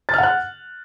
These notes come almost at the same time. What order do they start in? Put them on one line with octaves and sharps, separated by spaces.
A6 F6 F#5 F#6